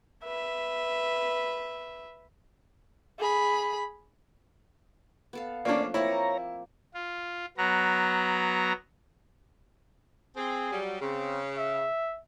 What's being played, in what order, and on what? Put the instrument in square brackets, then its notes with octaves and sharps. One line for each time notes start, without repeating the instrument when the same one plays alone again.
[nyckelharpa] B4 E5
[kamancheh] G#4 B5
[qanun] B3 A4 F5
[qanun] F3 A3 [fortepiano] A#3 C#4 D4 [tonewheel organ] D5
[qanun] A#3 C4 D5 [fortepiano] E4 [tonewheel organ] C#5 A#5
[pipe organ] F4
F#3 B3 A#5
[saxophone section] C4 [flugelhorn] G#4
[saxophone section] F#3 G3
[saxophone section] C#3 [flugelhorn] C4
[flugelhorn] E5